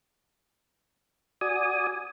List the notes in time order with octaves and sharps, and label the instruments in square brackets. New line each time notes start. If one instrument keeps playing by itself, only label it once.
[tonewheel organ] F#4 D5 G#5 D#6